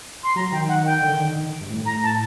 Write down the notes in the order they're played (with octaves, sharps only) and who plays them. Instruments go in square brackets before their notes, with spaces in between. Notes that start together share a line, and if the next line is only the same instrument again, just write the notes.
[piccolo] C6
[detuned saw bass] F#3 [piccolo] A#5
[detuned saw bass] D#3 [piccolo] G5
[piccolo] F#5
G5
[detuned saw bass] D3
D#3
D#3
D#3
G2
A2
[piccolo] A#5
A5